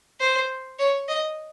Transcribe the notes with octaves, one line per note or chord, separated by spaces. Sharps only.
C5
C#5
D#5